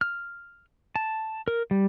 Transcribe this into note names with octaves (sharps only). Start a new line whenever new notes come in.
F6
A5
A#4
G3